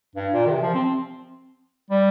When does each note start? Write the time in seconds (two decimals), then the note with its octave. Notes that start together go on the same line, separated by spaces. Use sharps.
0.15 G2
0.33 A#2
0.46 D#3
0.50 C3
0.62 F3
0.74 C4
1.90 G3